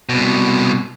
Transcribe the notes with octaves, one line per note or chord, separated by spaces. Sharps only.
C2 B2